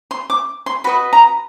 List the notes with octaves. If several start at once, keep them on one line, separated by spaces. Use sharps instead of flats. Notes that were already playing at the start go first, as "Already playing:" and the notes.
C6
D6
C6
F#4 B4 D#5 B5
A#5